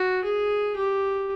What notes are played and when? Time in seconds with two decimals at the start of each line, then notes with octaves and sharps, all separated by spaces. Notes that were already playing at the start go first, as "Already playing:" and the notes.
Already playing: F#4
0.24 G#4
0.76 G4